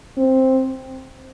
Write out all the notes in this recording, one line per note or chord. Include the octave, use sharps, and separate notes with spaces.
C4